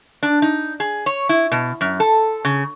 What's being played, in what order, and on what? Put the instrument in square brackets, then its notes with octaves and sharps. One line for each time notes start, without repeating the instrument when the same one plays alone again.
[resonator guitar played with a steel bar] D4
D#4
G#4
C#5
E4
B2
F#2
A4
C#3